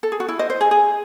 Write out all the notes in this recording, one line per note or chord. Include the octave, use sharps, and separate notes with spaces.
A4
G#4
F#4
E4
C5 D#5
C5
G#4
G#4